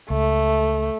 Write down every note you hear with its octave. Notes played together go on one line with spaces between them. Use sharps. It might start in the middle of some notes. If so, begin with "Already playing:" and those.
C#2 A3